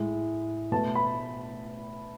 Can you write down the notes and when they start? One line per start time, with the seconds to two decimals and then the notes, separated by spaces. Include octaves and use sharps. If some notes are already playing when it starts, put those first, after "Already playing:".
Already playing: A2 G#3
0.72 B2 A3 A5
0.95 B5